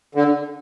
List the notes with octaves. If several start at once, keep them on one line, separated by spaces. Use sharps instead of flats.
D3